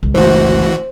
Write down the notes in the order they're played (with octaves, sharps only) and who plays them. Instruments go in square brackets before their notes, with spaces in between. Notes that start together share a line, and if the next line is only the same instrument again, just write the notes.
[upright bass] C#2
[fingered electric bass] G1 A3 [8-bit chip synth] E3 F#4 [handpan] C5